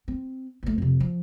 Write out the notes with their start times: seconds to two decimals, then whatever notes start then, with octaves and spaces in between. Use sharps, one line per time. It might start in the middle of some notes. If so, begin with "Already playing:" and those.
0.08 C4
0.63 D2 A3
0.78 F2 C3
1.00 F3